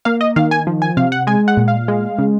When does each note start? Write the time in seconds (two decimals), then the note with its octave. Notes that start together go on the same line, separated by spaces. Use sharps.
0.05 A#3 F5
0.21 D#5
0.36 D#3 F5
0.51 G#5
0.67 F3
0.82 G#5
0.97 C3 F5
1.12 F#5
1.27 G#3 G#5
1.48 F#5
1.57 A#2
1.68 F5
1.88 G#3
2.19 C#3